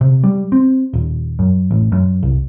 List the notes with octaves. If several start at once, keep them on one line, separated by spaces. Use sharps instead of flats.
C3
G3
C4
D#1
F#2
A1
F#2
C2